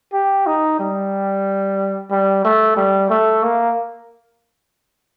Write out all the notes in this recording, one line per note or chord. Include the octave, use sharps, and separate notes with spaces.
G4
D#4
G3
G3
A3
G3
A3
A#3